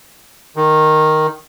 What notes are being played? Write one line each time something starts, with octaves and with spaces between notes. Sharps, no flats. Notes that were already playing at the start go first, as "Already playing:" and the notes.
D#3